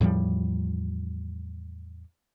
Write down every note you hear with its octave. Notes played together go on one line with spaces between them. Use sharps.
E2 A2 F3 G3